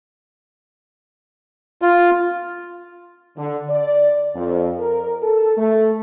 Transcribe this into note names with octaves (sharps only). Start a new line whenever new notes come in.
F4
D3
D5
F2
A#4
A4
A3